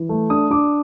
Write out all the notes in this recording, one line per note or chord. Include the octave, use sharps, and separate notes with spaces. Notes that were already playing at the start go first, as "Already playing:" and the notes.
Already playing: E3
A3
D4 D#6
D4 D6